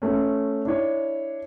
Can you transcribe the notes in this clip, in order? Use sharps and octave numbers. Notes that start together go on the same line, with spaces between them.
A3 C#4
D4 E4 C#5